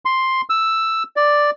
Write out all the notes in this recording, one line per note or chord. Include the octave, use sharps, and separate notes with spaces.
C6
E6
D5